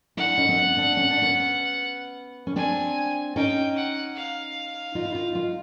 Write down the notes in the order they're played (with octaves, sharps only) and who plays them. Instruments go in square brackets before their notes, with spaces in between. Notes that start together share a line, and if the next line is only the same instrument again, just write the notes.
[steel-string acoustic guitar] D4 E4 [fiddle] F#5
[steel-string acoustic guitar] C#4 D#4
C4
B3 C#4
C4 D4
C#4
D4
B3 C#4
C#4
[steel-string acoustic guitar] C4 D4 [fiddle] G#5
[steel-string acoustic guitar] C#4 D#4 [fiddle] G5
[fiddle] F#5
F5
[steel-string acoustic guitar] D#4 F4
E4
D#4 F4
D#4 F4